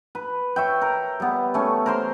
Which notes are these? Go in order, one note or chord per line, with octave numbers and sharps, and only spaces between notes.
B4
C#5 E5 G5
A#4
G3 B3
A3 C#4
A#4 C5 C6